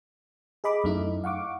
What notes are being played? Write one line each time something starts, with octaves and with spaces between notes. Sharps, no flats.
G#4 D#5 B5 D6
F#2 A3 D#4 E4
F5 F#5 C#6 D6